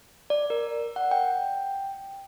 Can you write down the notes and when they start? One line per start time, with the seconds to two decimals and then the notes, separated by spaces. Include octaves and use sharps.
0.30 D5
0.50 A#4
0.96 F#5
1.11 G5